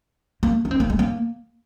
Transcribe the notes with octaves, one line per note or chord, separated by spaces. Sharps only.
A#3
C#4
C4
A#3
G#3
A#3